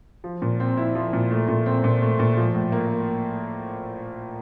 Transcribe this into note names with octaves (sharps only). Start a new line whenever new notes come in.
F3
A#2
C4
E4
F3
A#2
A3
A#2
C4
A#2
A3
A#2
F3
A2
A#3